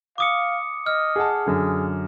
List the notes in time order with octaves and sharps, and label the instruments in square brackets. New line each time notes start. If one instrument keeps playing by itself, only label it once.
[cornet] F5 [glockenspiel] D6 D#6 C#7
[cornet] D#5 [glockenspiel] F6
[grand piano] G#4 F#5 A5
[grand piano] F#2 D3 [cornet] G#4